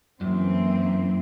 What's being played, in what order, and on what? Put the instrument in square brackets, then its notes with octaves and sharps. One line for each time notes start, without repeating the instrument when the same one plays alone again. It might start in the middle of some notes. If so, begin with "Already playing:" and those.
[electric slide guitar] F#2 [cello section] E3 A#3 C4